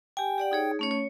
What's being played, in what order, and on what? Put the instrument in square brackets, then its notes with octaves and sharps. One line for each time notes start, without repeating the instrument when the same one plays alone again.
[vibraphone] G4 G#5 [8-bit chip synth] G5
[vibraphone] G4 D5 F#5
D#4 G#4 C#5
A3 C#4 C#5
C#5